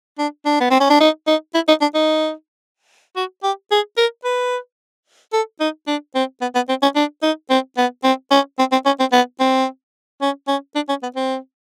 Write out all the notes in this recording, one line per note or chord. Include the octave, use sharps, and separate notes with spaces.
D4
D4
B3
C4
C#4
D4
D#4
D#4
E4
D#4
D4
D#4
F#4
G4
G#4
A#4
B4
A4
D#4
D4
C4
B3
B3
C4
C#4
D4
D#4
C4
B3
C4
C#4
C4
C4
C#4
C4
B3
C4
C#4
C#4
D4
C#4
B3
C4